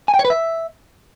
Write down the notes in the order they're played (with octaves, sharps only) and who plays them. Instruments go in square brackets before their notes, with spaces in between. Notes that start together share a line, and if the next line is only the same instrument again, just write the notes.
[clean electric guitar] G#5
G5
C#5
B4
E5